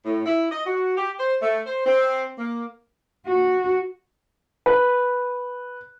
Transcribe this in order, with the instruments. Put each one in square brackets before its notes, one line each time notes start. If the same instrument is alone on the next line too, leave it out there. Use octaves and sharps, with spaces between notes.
[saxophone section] A2
E4
D#5
F#4
G4
C5
A3
C5
C4
A#3
[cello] F#4
[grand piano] B4